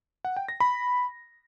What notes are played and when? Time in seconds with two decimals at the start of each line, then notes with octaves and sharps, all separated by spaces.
0.25 F#5
0.37 G5
0.48 A#6
0.60 B5